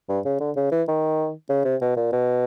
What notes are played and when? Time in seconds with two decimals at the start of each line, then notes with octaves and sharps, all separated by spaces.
0.09 G2
0.25 C#3
0.40 D3
0.56 C#3
0.71 E3
0.88 D#3
1.49 C#3
1.65 C3
1.81 B2
1.96 A#2
2.12 B2